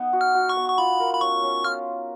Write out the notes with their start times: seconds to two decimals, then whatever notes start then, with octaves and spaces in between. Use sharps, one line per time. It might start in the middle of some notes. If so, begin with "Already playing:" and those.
Already playing: B3 D#4
0.13 F#4
0.21 F6
0.35 F#4
0.49 C#6
0.57 B3
0.70 C#6
0.78 F4 B5
1.00 A#4
1.14 B5
1.21 C#4 C#6
1.43 C#4
1.64 F4 F6